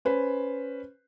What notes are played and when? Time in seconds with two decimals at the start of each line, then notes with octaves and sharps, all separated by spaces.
0.05 C#4 B4 C5